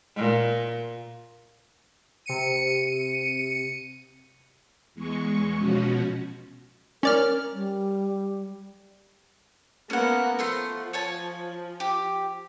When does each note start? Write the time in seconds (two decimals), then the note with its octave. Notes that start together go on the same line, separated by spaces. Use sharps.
0.17 A#2
2.26 C3 C#7 D#7
4.94 E2 G#3 C#6
5.58 B2 F3 C#4 F#4
7.03 C#4 A#4 D5 F6
7.53 G3
9.90 A#3 B3 C#4 A#4 F#5
10.39 F3 A3 F#5 C6
10.93 C#5 G#5 A5
11.80 G4